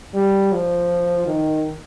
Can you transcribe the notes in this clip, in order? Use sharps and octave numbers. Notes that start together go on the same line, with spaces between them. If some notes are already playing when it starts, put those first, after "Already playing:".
G3
F3
D#3